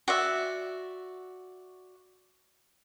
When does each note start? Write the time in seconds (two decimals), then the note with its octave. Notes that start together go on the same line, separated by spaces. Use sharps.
0.08 F#4 D5 E5